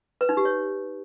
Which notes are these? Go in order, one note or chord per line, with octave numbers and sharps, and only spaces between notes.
B4
D#4
G4
C#5